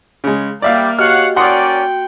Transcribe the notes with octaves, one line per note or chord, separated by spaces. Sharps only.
C#3 G#3
G3 A#3 D5 E5 F5
F#4 G4 C#5 D#5 F5 F#5 F6
C#4 F#4 A#4 D5 F#5 G5 C6 D#6